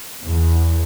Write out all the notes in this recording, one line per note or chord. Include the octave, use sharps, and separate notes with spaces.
E2